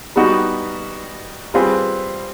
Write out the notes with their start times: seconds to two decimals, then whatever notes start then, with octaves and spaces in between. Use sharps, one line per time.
0.16 G3 B3 D#4 F#4
1.54 G3 C4 F4 G#4 B4